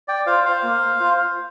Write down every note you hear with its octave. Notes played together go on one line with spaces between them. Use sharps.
D5 G5
F4 C5 F5
C5 F5
A#3
F4